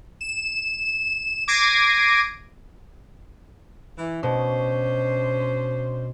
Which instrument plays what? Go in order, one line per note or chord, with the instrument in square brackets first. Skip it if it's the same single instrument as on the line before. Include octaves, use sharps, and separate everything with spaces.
[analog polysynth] E7
D6 G#6 A#6 C7 D7 D#7
[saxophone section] E3
[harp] B2 [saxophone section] C#4 D4 C5